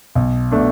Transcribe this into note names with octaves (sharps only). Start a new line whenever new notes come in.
B1
B2 A3 D4